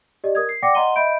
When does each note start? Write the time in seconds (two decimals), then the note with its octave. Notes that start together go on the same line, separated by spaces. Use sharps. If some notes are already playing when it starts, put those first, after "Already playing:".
0.24 G4 D5 D#5
0.35 A#4 D#6 G#6
0.49 C7
0.63 D5 F#5 G5 D6 A#6 C#7
0.75 D#5 F#5 A#5 C6 D#7 G7
0.96 D#5 E5 B5 G6 D7